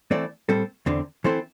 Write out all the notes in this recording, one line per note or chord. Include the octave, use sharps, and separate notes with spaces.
E3 A3 C4 A4 D5
A2 G3 C4 A4
E2 D3 C4
E3 C4 E4 A4 C5